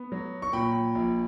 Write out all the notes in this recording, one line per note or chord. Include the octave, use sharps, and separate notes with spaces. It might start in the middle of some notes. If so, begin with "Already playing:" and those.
Already playing: B3
F#3
C#6
A#2 G5 B5
A#1